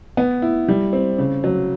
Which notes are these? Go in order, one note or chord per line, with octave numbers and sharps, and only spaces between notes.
B3
E4
G3
C4
C#3
F#3